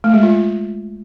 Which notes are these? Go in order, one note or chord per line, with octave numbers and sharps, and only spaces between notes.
A3
G#3
F4